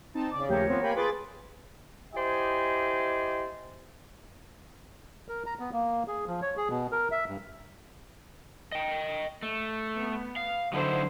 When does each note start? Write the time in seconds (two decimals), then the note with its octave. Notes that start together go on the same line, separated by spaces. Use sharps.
0.14 C4 D#4 A5
0.32 C#3 D5 D6
0.48 D#2 F3 A3 G4 A#4 C#5
0.68 F3 B3 C4
0.82 A#3 G4 G5 G#5 B5
0.96 F4 G#4 B4 C6 D6 A6
2.14 E4 G4 C5 D5 D#5 G#5
5.29 A#4
5.46 A#5
5.59 B3
5.72 A#3
6.08 G#4
6.27 F3
6.42 C#5
6.57 G#4
6.69 B2
6.92 A#4
7.12 E5
7.28 G2
8.72 D#5 G5
9.42 A3
9.99 B3
10.36 F5
10.73 D3 F#3 D#4 E4 C5